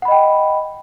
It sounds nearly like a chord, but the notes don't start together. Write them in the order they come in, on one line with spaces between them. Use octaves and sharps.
F#5 B5 D#5 G5